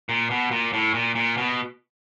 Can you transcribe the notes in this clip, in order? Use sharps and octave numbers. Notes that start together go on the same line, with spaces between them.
A#2
B2
A#2
A2
A#2
A#2
B2